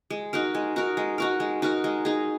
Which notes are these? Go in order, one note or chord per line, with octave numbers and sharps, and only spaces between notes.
G#3
D#4 F#4 A#4
G#3
D#4 F#4 A#4
G#3
D#4 F#4 A#4
G#3
D#4 F#4 A#4
G#3
D#4 G#4